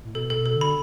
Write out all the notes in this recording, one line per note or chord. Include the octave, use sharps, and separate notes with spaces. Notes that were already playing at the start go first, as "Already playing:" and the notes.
A2
B2 A4
A4
B2
A4
D3
B5